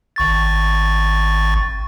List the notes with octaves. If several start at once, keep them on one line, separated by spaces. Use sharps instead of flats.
G#1 C#6 A6